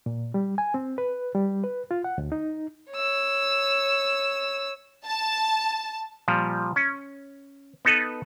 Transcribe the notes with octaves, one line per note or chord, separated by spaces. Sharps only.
A#2
G3
G#5
C4
B4
G3
B4
F4
F#5
D2
D#4
C#5 E6
A5
A#2 F3 G3
C#4
B3 D#4 A4 B4